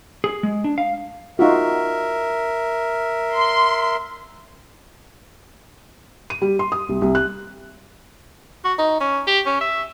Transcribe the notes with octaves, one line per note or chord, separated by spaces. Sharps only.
G#4
G#3
D4
F5
D#4 F4 F#4 A#4 E5
C6
D#7
G3
C6
D#6
C2
C2
F#6
F#4
D#4
C#4
G4
C#4
E5